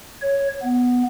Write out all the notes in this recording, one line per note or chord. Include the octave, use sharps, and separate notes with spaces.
C#5
B3